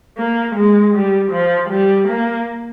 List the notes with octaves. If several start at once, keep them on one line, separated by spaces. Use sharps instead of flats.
A#3
G#3
G3
F3
G3
A#3